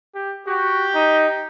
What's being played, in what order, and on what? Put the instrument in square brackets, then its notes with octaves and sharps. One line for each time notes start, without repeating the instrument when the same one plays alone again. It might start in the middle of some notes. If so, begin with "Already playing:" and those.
[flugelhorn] G4
[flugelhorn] F#4 [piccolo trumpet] G4
[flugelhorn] D#4